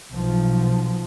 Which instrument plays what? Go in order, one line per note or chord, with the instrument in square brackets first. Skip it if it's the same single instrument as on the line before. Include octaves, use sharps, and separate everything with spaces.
[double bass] B1 F3